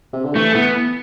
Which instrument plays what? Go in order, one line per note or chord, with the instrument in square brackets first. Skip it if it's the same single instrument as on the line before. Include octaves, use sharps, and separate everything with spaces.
[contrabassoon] C3
D3
[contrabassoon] E3 [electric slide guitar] A3
[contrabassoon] E3 [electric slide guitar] B3